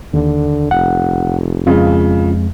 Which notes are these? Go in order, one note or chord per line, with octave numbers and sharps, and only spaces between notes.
D#2 D3
F1 F#5
F2 C#3 G#3 F4